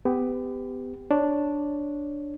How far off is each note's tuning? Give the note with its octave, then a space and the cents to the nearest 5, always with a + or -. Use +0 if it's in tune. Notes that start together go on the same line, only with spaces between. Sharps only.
B3 +30 G4 +15
D4 +0 C#5 +0